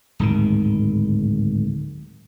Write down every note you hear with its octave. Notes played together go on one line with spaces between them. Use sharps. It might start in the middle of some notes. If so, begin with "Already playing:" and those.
D1 G#2 D#3